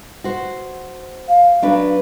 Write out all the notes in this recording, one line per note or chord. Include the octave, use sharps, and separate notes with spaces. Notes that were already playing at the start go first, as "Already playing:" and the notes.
F#4 C5
F5
F#3 D4 B4